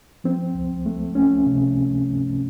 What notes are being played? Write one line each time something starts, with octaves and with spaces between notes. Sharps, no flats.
F3 C4
C#2
A3
A3 C#4
C3